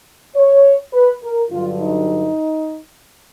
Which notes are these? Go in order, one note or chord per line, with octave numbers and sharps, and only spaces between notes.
C#5
B4
A#4
G2 D3 F#3 F4
D#4